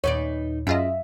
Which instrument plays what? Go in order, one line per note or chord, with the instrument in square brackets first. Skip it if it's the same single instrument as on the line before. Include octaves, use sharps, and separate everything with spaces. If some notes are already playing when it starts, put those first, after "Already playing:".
[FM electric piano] D#2 A#2 [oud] D#4 B4 D5 [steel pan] C#5
[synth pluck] F#2 F4 D#5 [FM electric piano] C#4 G#4 [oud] E5